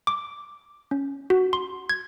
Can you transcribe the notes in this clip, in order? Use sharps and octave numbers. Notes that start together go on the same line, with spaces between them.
D6
C#4
F#4
C6
G#6